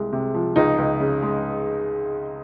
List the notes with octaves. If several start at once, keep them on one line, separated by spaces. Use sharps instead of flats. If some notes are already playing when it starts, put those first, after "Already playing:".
Already playing: C2 G#3
C3
F3
C#2 D#4
C#2
C#3
G#3